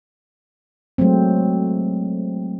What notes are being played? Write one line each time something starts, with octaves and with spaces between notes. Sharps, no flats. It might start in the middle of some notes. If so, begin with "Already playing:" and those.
F#3 G#3 A3 C4